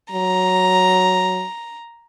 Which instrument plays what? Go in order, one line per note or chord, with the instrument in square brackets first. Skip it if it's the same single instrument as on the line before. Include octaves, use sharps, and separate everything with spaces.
[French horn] F#3 [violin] A#5